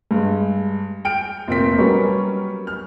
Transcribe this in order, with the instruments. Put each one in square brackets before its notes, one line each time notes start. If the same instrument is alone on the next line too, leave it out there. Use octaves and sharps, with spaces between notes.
[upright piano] G2 G#3
G5 F6 D7
F1 A#2 C4 A#4 B6
F#3 G3 B3 C#4 A#4 C#6
F6